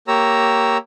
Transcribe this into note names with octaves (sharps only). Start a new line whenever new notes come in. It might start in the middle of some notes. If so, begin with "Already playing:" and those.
A#3 G4 C#5 A#5 E6